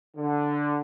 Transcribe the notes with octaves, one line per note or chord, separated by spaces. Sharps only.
D3